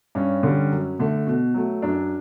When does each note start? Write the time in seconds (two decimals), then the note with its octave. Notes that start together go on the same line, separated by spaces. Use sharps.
0.15 G2 C#4
0.43 D3 G3
0.71 F#2
0.99 D3 A3
1.27 B2
1.54 F#3 A3
1.82 F#2 D4